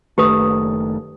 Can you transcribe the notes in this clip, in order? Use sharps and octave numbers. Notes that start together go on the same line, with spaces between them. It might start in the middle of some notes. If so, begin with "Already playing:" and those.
F#1 D#3 A3 G4 B4 D#6